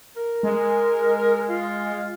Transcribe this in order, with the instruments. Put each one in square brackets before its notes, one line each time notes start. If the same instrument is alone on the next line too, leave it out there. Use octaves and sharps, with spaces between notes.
[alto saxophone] A#4
[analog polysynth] G#3
[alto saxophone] F4